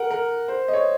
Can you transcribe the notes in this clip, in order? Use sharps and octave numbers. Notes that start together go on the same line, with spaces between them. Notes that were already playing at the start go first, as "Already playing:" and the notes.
Already playing: A#4 F#5
A#4
C5
D#5
C#5